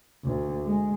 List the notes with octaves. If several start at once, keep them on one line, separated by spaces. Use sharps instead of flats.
D2
G#3